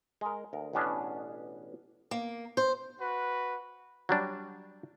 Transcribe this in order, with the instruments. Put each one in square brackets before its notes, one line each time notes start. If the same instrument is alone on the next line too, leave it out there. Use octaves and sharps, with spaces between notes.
[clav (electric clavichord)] G#3 A#4
D2 A#4
A1 B2 B3 C#4 D4 G#4
[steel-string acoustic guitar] A#3
C5
[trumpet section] F#4 B4
[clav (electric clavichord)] F#3 G3 D4